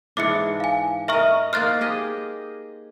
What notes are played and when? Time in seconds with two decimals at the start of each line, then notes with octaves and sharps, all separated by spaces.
0.17 G#2 E3 D4 D6 C#7
0.60 F5 G#5
1.08 A#4 D#5 E5 C#6 F6
1.53 A#3 D#4 C5 F6 F#6 A6
1.81 G4 G#4 D#5